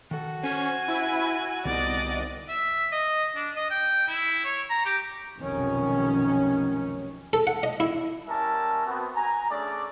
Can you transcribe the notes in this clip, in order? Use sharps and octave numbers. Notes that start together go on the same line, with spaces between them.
D#3 F#4 A4
C#4 C5 G#5
E4
C2 D3 B3 D#4 D5 D#5
E5
D#5
D4
D#5
G5
E4
C#5
A#5
G4
F1 B1 D#3 C#4
A4
F#5
D#5
E4
G3 C#4 A#4 E5 G#5 A5
B3 C4 F#4
G#5 A#5
A3 C#4 D4 G#4 D5